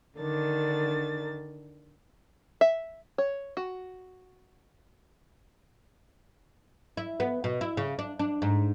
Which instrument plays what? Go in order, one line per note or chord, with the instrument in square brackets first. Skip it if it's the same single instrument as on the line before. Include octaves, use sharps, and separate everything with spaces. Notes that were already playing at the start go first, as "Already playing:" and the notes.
[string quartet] D3 D#3 D4 A6
[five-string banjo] E5
C#5
F#4
[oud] E4
B3
B2
E4
C#3
D4
D4
G#2